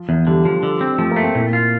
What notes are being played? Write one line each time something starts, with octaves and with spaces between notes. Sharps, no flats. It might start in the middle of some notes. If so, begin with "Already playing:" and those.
Already playing: F3
E2
D3 G3
F3
D3
C4
F3 A3
A#3
A3
C4
A#2 E4
F4